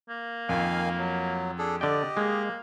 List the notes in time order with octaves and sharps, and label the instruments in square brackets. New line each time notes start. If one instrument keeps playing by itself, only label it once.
[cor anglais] A#3
[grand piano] F2 [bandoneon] D#3 F5 G#5
[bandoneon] F#3
D4 G#4 A4
[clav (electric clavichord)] D3 G5 [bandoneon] G4 D#5 [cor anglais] D5
[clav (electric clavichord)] G#3 [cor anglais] A#3